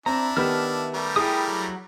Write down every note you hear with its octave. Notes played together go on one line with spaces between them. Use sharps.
C4 D4 E4 A#5
D#3 B3 G4 E5 A5 F6
G3 A3 A#4
E4 G#4 G5 B5 D#6
F#3